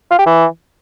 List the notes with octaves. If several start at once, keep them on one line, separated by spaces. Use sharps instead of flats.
F4
G4
E3